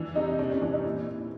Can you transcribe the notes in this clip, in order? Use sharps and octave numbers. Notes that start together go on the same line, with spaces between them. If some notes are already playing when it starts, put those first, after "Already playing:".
Already playing: E3 D4
C3 D#4
C3 D4
C#4
E3 D4
D#4
A#2 E4
A#2